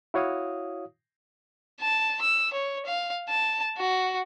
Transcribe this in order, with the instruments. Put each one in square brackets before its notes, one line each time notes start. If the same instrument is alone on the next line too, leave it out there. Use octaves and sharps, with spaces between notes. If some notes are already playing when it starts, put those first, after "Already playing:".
[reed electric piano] E4 F#4 C#5 F5 D#6
[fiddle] A5
E6
C#5
F5
A5
F#4